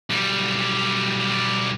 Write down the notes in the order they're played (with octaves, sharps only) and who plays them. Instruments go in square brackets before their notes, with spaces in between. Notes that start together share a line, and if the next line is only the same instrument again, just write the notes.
[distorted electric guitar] B1 G3